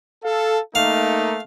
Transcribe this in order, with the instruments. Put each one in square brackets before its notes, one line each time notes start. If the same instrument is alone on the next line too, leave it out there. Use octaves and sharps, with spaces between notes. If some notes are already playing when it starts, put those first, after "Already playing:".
[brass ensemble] A4 [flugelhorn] F5
[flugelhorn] A3 [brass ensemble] A#3 D#4 [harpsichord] F5